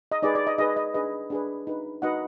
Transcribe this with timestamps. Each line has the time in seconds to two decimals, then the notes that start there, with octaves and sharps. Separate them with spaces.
0.12 D#5
0.22 D#4 G#4 B4 D5
0.35 D5
0.47 D#5
0.58 D#4 G#4 B4 D#5
0.76 D#5
0.94 D4 G#4 B4 D#5
1.30 D4 G#4 B4
1.67 D#4 F#4 B4
2.02 D#4 F#4 B4 D#5 F#5